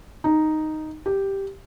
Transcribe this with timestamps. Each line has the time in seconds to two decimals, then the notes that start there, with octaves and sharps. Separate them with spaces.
0.24 D#4
1.06 G4